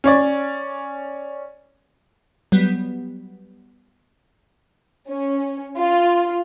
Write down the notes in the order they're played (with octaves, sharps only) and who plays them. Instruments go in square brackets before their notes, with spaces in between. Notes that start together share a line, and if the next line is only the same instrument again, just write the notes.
[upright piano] C#4 C#5 D5
[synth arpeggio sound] F#3 G3 B3
[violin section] C#4
F4